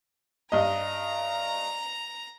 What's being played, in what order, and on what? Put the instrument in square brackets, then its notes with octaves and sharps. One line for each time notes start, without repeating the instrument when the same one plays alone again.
[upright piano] G2 D#5 [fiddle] A#5